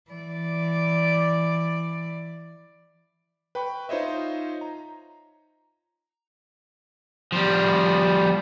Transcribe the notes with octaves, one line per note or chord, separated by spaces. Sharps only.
E3 D5
B4 G5 B5 C#6
D#4 F4 C5 C#5 D#5 E5
A#5
F3 G3